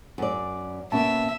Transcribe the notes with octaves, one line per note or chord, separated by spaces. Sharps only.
F#2 D5
B2 A#3 C#4 E5 A5